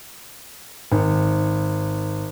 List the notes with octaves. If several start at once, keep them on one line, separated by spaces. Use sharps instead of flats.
G#1